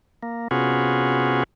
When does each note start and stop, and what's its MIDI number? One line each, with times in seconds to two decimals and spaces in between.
0.23 0.48 58
0.51 1.43 48
0.51 1.43 59
0.51 1.43 61
0.51 1.43 65
0.51 1.43 66
0.51 1.43 68